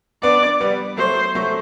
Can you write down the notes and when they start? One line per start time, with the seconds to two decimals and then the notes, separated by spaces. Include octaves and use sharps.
0.23 B3 D4 D5
0.60 G3 B3
0.98 F#3 A3 C5
1.35 F#3 A3